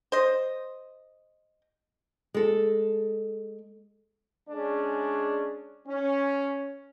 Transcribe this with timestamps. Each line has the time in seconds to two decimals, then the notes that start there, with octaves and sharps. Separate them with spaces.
0.12 C5 D#5
2.34 G#3 A4
4.49 G#3 C#4 D4 G#4 D5
5.88 C#4